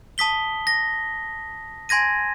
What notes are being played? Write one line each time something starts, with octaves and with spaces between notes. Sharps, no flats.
A5 D#6 B6 G7
A#6
G#5 C6 G#6 A#6 D#7